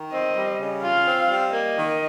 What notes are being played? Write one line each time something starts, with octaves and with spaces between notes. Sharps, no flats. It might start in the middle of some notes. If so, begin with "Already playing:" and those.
Already playing: D#3
C4 D#5
G3
C#3
F4 F5
C4
G3
A#3 D#5
D#3